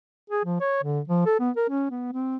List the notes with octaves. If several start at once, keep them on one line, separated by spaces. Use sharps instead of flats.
G#4
F3
C#5
D3
F3
A4
B3
A#4
C#4
B3
C4